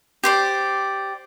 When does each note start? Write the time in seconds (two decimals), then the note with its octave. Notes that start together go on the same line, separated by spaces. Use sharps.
0.24 G4 C5 D5